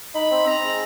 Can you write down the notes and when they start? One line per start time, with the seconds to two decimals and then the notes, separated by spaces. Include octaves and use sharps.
0.15 D#4 B5
0.32 C4
0.46 C4 A#5
0.63 G#3